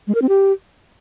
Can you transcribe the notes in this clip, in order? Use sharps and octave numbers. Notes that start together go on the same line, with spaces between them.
G#3
A#4
C4
G4